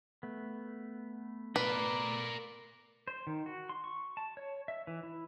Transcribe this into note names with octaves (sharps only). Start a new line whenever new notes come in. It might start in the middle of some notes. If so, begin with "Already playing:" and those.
A3 B3
A#4 B4 D5
C5
D#3
F#4
C6
C#6
A5
C#5
E5
E3
E4